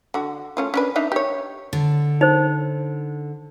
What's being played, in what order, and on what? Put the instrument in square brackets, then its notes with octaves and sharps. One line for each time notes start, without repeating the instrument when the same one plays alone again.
[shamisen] D3 F#4
A3 C#4 F4
C#4 D4 B4
D4 D#4 E5
G4 C#5
[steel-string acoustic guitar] D3
[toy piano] D#4 C5